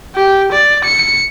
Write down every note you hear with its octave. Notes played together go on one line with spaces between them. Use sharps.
G4
D5
C#7